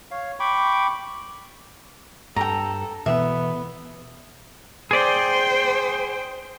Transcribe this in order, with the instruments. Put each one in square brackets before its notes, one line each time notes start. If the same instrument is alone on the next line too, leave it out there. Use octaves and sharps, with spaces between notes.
[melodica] C#5 F5
G5 B5 C#6 D6
[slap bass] G2 [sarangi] A4 [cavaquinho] G5 A#5
[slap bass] B2 E3 [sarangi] B3 [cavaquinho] E5
[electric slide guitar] G#4 D5 [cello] C5 G5